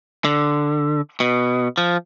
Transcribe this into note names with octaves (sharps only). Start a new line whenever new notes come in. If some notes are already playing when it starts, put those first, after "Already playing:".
D3
B2
F3